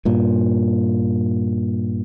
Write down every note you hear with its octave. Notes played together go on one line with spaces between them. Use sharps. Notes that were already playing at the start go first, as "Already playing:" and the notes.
G2 A#2